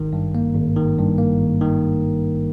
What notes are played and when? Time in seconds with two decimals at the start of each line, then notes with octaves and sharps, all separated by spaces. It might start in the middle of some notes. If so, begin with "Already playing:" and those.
Already playing: G#1 D#3
0.13 G2
0.35 A#3
0.55 G#1
0.76 D#3
0.98 G2
1.18 A#3
1.40 G#1
1.61 D#3